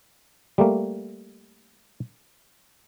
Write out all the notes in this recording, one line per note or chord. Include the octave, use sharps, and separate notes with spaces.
G3 A3 A#3